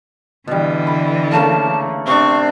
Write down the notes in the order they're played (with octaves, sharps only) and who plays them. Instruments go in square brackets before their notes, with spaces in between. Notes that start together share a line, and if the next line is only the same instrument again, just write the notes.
[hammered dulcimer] B2 G3 [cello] D3 E3
[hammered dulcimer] B5
[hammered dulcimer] C#3 A3 A#3 [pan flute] A5
[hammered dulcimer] C3 D4 [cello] C4 C5 [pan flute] C#6